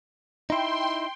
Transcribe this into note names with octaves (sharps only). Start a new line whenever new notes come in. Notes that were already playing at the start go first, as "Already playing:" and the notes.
D#4 E4 G5 C6